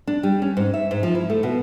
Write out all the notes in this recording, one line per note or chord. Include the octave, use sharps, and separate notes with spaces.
D4
G3
C#4
G#2
E5
G#2
F3
E4
A3
B2